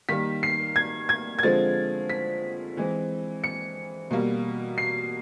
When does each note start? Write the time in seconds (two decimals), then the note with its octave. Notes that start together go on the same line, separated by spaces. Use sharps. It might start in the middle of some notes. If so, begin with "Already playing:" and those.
0.09 D#3 G3 A#3 B6
0.43 C7
0.76 G#6
1.09 G#6
1.39 G#6
1.43 D3 F3 G#3 C4 A6
2.10 B6
2.77 E3 G#3 C4
3.44 C#7
4.11 B2 G3 A#3
4.78 C7